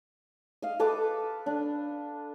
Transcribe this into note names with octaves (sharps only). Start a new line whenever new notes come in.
D#5 F5
A4 B4 D6
D4